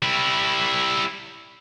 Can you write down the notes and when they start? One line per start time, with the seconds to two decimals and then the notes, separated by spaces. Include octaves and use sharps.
0.03 G3 E4